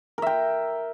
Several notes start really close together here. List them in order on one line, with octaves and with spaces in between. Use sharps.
A#4 E5 G5